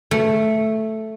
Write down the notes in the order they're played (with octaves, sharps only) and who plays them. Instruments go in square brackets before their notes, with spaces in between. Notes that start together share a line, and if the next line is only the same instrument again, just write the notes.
[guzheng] A3